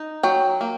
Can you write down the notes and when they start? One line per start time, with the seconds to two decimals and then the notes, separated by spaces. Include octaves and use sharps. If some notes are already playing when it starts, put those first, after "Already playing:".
Already playing: D#4
0.23 F#3 G5
0.61 A#3